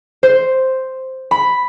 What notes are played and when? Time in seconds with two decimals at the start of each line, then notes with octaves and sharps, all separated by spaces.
0.23 C5
1.31 B5